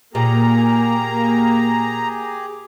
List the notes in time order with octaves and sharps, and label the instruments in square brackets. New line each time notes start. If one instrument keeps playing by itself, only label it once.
[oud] A#2 [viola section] A#3 [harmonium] G4 G#4 [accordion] A#5